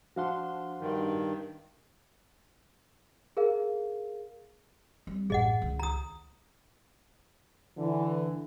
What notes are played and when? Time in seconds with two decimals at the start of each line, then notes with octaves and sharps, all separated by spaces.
0.16 F3 D4 F#4 F5 F#5 C6
0.81 G2 D#3
3.37 G#4 A#4 F5
5.07 G3 C4
5.30 A1 F#2 G#4 D#5 F#5
5.62 C#2 D#3
5.79 A#5 D#6
7.77 D3 E3